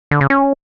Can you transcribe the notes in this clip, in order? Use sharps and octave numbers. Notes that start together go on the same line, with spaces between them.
D3
C#3
C#4